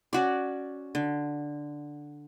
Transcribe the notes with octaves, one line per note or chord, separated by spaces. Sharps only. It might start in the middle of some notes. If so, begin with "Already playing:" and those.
C#4 F#4 D5
D3